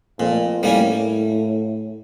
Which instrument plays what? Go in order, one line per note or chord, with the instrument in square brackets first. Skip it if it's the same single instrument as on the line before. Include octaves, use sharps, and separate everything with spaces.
[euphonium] F2 [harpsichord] A#2
[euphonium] A2 [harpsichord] G3 A#3 C#4